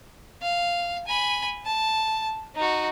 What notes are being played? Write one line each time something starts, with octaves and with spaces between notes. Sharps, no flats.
F5
G#5 B5
A5
D#4 F#4